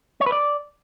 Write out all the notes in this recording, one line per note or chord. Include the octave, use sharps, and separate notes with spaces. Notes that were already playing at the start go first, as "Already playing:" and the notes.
C#5
B4
D5